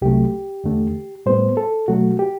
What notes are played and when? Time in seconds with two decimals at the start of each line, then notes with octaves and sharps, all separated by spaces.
0.02 C2 C3 F#3 A3 G4
0.64 E2 D3 A3
1.26 A2 G3 B3 C5
1.57 A4
1.88 B2 F#3 A3 F#4
2.19 G4